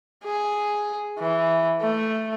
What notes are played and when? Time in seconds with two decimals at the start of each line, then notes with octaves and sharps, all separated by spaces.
0.24 G#4
1.19 E3
1.81 A3